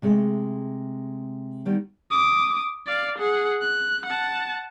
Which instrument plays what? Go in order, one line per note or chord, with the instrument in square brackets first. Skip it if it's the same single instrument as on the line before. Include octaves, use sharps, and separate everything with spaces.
[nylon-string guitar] C3 G#3 A3
D#3 G3 B3
[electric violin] D6 D#6
D5 F5
G#4 F#5
F#6
F#5 A5